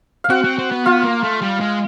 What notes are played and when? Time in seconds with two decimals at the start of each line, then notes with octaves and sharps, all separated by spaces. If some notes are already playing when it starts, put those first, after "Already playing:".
0.24 F5
0.30 C4 F#4 F#5
0.44 C4
0.58 C4
0.71 B3
0.86 B3 F4 F5
1.04 A#3
1.23 A3
1.41 G3
1.60 G#3